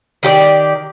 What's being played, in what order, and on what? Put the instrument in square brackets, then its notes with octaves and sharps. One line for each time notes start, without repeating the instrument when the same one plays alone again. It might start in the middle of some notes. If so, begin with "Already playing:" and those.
[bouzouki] D#3 G4 D5